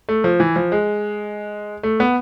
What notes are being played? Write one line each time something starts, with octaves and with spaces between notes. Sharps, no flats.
A3
F3
E3
F3
G#3
A3
B3